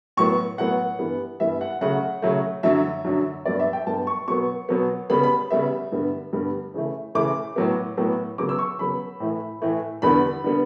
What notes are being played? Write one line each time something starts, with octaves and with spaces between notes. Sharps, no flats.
A2 F#3 B3 C#6
A2 F#3 B3 F#5
G2 E3 G3 B3
G2 E3 G3 B3 E5
F#5
C#3 F#3 A3 F#5
C#3 F#3 A3
F#2 D3 F#3 E5
F#2 D3 F#3
G2 F#3 B3 D5
E5
G5
G2 F#3 B3 A5
C#6
B2 F#3 B3 C#6
B2 F#3 B3
C#3 G3 B3 B5
B5
C#3 G3 B3 E5
G2 D3 G3 B3
G2 D3 G3 B3
C#3 E3 A3
C#3 E3 A3 D6
A2 F#3 B3
A2 F#3 B3
C#3 F#3 B3 D6
E6
C#6
C#3 F#3 B3 B5
A2 E3 A3
A2 E3 A3
E2 D3 G3 B3 B5
D3 G3 B3